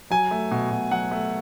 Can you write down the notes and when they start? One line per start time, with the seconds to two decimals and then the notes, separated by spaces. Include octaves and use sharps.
0.10 F#3 G#5
0.31 A3
0.51 B2
0.71 B2
0.91 F#3 F#5
1.11 A3